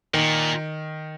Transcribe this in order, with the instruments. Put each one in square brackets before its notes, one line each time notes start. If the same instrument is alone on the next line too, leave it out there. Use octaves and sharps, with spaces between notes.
[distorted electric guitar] A#2 [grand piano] D#3